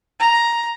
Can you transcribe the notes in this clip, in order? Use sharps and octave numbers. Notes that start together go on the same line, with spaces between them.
A#5